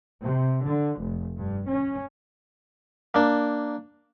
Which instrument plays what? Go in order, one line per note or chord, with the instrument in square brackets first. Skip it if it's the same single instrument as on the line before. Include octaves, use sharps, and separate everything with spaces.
[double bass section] C3
D3
F1
G2
C#4
[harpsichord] A#3 D4